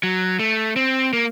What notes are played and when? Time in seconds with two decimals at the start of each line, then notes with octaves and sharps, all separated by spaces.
0.03 F#3
0.39 A3
0.76 C4
1.13 A#3